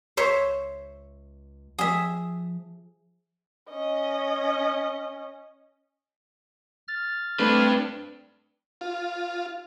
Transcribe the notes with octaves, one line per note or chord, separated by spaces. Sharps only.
C#2 C5 C#5 E5
F3 G#4 E5
C#4 D#5
F6 A6
A3 C4 D4 B4
F4